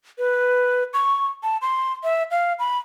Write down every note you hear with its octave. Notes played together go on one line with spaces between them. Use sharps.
B4
C#6
A5
C6
E5
F5
B5